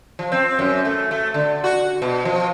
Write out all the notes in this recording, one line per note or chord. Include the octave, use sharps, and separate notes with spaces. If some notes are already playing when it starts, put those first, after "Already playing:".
F3
C4
F#2
A3
A3
D3
F#4
B2
F3